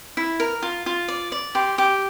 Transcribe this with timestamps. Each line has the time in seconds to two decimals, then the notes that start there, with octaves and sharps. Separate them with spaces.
0.17 E4
0.40 A#4
0.62 F4
0.86 F4
1.08 D5
1.32 D5
1.55 G4 C6
1.78 G4